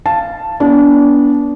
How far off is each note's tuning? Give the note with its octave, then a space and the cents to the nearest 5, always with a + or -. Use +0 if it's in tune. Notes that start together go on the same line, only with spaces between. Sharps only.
F5 -20 A5 +0
B3 -25 D4 -30